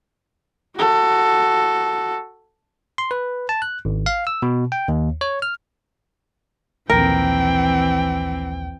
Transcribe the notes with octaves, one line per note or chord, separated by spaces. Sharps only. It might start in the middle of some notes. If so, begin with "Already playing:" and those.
F#4 A4
C6
B4
A5
F#6
G#1
F5
E6
B2
G5
D#2
C#5
F6
A#1 D#2 E3 C4 A#4 G5